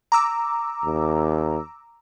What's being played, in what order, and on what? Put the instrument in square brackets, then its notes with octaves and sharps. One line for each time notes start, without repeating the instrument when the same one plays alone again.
[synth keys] A#5 D6 E6
[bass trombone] D#2